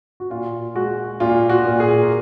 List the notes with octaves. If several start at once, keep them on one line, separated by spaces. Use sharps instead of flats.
F#4
A#2 F4
G#3 F#4
A#2 F4
F#4
A#2
G#4
A#4